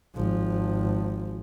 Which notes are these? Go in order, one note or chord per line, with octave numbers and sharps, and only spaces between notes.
G#1 F3